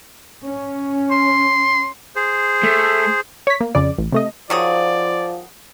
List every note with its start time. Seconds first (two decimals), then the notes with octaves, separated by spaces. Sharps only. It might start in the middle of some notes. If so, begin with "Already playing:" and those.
0.43 C#4
1.11 C6
2.16 G#4 C5
2.63 A3
3.47 C#5 B6
3.61 A#3
3.75 F2 C#3 D5
3.98 A1
4.12 C3 A3 D#5
4.50 D#3 F3 F#3 G#4 D5